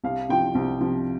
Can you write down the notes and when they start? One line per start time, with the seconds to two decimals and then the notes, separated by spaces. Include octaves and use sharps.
0.04 C2 F5
0.29 C3 F3 G5
0.55 C2
0.81 C3 F3